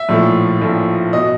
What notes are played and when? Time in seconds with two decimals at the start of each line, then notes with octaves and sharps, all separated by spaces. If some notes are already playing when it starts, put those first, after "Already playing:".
Already playing: E5
0.09 A#1 A2 F3 A3
0.61 A#1 A2 F3 A3
1.13 B2 D#5